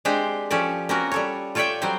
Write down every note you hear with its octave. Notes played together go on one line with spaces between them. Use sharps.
G#3 C4 D4 G4 C5 G5
F3 C#4 G4 A4 C#5 D5
A#3 C4 C#4 F4 F#4 A#4
G3 A4 C#5
F4 A4 C#5 D5 E5 G5
F#3 G3 C4 C5